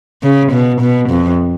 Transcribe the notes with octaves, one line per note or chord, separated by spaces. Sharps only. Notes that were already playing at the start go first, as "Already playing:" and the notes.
C#3
B2
B2
F2